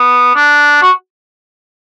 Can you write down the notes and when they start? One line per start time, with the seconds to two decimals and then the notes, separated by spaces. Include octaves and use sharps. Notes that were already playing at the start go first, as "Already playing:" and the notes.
Already playing: B3
0.36 D4
0.82 F#4